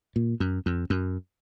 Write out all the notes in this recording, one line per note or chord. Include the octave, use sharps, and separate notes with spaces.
A#2
F#2
F2
F#2